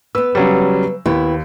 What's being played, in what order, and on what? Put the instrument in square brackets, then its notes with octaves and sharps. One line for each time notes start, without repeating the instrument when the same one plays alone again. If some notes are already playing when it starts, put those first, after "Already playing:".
[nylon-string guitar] B3 B4 [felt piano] E6
[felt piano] C#3 F#3 G3
[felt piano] D#2 [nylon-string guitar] B3 E4 G5